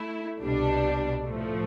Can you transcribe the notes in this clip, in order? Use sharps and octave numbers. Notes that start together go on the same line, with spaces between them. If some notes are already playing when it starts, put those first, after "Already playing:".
Already playing: A3 E4
C2 B2 G3 D4
A2 F3 A3